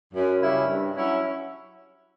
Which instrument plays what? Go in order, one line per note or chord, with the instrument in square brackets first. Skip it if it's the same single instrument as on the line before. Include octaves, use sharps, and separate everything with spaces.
[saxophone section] F#2
C#3 G3 C#4 E4
G2
F#3 C#4 E4